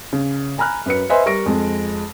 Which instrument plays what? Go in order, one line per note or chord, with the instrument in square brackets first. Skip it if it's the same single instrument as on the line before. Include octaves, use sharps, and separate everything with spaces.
[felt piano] C#3
G#5 A#5 B5 F6 F#6
F#2 B4 C#7
B4 C5 D#5 E5 G#5 C6
G3 A#4 C#6 A#6 D7
F2 G#3